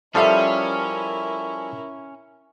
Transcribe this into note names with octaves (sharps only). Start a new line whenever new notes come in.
F3 G3 C#4 E4 A4 A#4 E5 F5